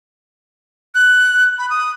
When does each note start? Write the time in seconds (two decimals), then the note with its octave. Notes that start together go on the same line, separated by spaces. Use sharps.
0.95 F#6
1.59 B5
1.70 D#6